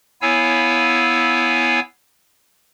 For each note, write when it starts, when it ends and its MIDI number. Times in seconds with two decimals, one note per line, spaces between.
0.22 1.80 59
0.22 1.80 64
0.22 1.80 73
0.22 1.80 77
0.22 1.80 80
0.22 1.80 88